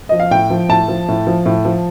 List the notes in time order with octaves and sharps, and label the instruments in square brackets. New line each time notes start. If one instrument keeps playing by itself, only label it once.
[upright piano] F3 D#5
F5
A2 G5
F3
A2 A5
F3
A2
F3
A2
F3